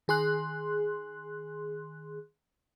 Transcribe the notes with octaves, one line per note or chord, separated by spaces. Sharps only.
D#3 G#4 C6 F#6